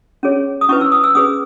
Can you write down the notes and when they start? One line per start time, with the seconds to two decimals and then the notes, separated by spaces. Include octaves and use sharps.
0.23 C#4 G#4 C#5
0.61 D#6
0.69 C#4 E4 B4 C#6
0.81 E6
0.92 D#6
1.04 E6
1.15 C#4 G#4 B4 D#6